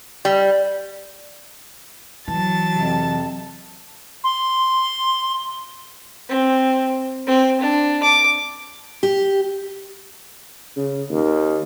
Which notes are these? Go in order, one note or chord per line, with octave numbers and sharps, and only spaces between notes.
G3
E3 F#3 A5 A6
F2 C3
C6
C4
C4
D4
D6
G4
C#3
D#2